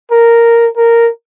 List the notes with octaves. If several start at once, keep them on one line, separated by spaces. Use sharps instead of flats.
A#4
A#4